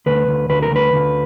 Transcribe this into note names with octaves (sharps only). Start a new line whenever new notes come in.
D2 B4
D2
D2 B4
A#4
D2 B4
D2